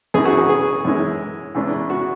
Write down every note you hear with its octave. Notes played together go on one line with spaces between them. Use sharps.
F#2 C#3 E3 G#4
F#4
G#4
G#4
F#2 E3 G#3 C#4
E2 C#3 G#3 D4
F#4